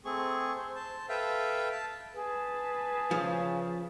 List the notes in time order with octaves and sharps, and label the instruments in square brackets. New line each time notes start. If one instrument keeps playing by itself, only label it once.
[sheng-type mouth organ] A3 C4 G#4 C#6
C5
C5 A5
A4 B4 E5 F5 G5
A5
[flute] G#4 [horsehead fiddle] B4 A5
[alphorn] C#3 [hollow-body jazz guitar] F3